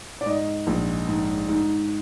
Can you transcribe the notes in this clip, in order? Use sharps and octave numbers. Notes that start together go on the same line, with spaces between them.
D5
G#2 D#5
A#1
G#2
G#2